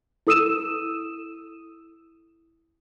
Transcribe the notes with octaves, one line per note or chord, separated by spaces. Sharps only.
E4 A4 D#6 E6 D#7 E7